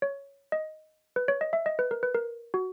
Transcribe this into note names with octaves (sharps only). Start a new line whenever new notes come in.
C#5
D#5
B4
C#5
D#5
E5
D#5
B4
A#4
B4
A#4
F#4